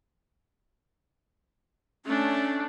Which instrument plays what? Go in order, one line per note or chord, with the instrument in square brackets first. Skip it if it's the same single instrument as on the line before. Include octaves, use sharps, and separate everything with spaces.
[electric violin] A3 D4 [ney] C#4